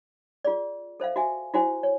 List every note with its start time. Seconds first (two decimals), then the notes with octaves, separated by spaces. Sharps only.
0.45 F4 G#4 D5
1.00 A4 C5 E5 F5
1.16 F#4 E5 G#5
1.54 E4 F#4 C5 G#5
1.83 C#5